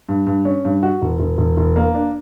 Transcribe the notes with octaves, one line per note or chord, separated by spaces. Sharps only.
G2
G2
C#4
G2
F#4
E1
E1
E1
E1
A#3
D4